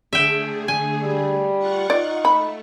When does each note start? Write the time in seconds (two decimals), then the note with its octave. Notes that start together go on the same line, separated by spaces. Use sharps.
0.13 D3 A3 G#4 E5 G5
0.68 G#5
1.04 G3
1.58 F4 F#5 C#6
1.90 D#4 D5
2.25 A3 B5